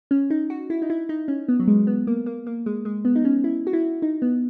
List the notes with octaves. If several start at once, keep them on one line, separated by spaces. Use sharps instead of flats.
C#4
D#4
F#4
E4
D#4
E4
D#4
C#4
B3
F#3
G#3
B3
A#3
A#3
A#3
G#3
G#3
B3
D#4
C#4
E4
F#4
E4
D#4
B3